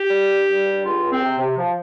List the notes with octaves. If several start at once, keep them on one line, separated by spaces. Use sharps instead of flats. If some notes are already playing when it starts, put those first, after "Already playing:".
Already playing: G4
G3
G2
G3
G2
C#2 F4
C#2
C4
C3
C3
F3